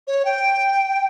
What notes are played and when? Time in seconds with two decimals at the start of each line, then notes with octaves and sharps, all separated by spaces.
0.07 C#5
0.25 G5